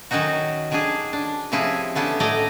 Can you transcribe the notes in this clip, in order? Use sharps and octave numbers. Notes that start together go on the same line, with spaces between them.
D#3 F#3 C#4 D#4 F#4
D#3 F#3 C#4 D4 G#4
D4
C3 F3 C#4 E4 G#4 B4
A3 B3 C#4 D4
A2 A3 D5 D#5 G#5 A#5